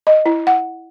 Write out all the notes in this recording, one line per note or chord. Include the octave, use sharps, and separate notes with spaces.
D#5
E4
F#5